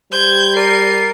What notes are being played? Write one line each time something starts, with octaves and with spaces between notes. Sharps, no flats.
G3 C5 G6 G#6
A#4 D5 C7 D#7